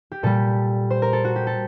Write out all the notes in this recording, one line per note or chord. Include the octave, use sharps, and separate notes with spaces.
G4
A#2 G3 A4
C5
A#4
A4
F#4
G4
A4